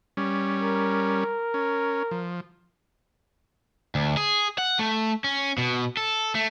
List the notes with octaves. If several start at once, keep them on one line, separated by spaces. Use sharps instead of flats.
G3 C#4
A#4
C#4
F3
D2
G#4
F#5
A3
C#4
B2
A4
A3